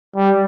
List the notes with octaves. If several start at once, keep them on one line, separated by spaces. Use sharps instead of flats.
G3